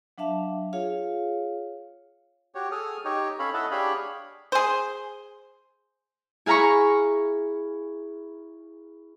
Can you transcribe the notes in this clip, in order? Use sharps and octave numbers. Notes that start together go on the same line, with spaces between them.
F#3 D4 E5 F5 A5
F4 G#4 C#5 F5
F#4 G4 C#5
G#4 A4 D#6 F6
D#4 G4 C#5
C#4 A4 C#5 F5 B5
E4 A4 D#5 E5 F#5 A5
D4 G4 G#4 C#5 F5 B5
G#4 C5
E4 G#4 F5 A#5 B5 C#6